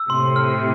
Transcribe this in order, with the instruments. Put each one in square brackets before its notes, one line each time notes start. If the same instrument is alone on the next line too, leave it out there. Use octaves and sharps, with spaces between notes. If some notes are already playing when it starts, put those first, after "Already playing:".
Already playing: [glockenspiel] E6
[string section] A2 C3 [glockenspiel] C6
[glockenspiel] F6